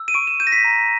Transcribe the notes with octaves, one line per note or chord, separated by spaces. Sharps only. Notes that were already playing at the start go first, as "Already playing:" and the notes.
Already playing: E6
D#7
C#6 D7
E7
G6 D#7
A#6
B6
A#5